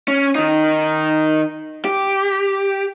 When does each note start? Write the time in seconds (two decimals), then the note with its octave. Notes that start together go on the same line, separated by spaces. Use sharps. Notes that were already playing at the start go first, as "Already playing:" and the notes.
0.08 C#4
0.35 D#3 D#4
1.85 G4